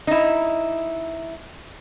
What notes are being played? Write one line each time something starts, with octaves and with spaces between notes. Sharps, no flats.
D#4 E4